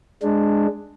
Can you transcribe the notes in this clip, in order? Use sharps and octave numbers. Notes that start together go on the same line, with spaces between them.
G#3 D4